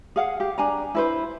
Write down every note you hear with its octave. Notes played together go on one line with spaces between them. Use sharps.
G#4 F5 F#5
G4
D4 G#5 A#5
E4 B4 C5